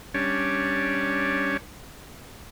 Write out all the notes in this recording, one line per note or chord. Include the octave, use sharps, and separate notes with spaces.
G3 C#4 D4 C#5